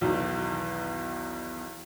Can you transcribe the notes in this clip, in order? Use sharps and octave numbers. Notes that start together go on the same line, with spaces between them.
B1 E2 B2 D#3